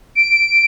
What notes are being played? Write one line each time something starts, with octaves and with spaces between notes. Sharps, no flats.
D7